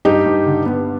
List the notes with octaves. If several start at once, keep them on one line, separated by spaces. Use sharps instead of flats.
G2 D#4 G4
G2
D3
B3